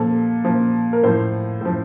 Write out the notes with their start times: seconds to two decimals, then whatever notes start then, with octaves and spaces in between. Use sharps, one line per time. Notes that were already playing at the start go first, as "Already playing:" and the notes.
Already playing: A#2 F3 A4
0.45 A#2 F3
0.93 A#4
1.03 A2 F3 C5
1.61 A2 F3